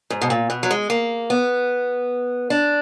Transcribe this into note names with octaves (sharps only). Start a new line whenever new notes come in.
G#2
B2
A#2
B2
F#3
G#3
A#3
B3
D4